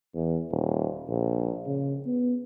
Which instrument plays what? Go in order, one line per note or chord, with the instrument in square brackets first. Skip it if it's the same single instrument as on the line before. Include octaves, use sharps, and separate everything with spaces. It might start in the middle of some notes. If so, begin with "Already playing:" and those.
[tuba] E2
D#1
A#1
C#3
B3